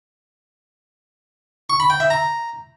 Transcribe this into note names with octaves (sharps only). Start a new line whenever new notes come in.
C#6
B5
G5
E5
A#5